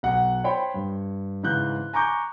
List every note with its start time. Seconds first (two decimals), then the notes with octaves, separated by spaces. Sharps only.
0.03 B1 F#5
0.44 C5 C#5 G5 B5 C6
0.74 G2
1.43 G#2 C#3 E3 F#6 G6
1.93 G#5 A#5 C#6 D6 G6